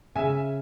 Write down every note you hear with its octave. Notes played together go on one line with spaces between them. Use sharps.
C#3 E5 G#5